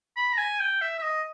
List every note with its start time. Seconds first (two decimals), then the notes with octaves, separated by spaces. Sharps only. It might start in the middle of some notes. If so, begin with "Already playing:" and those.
0.17 B5
0.33 A#5
0.38 G#5
0.60 G5
0.81 E5
0.99 E5
1.02 D#5